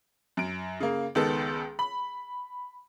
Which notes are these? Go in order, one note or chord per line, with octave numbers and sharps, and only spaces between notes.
F#2 D7
C#3 A#3
C#2 D#3 B3 A4
B5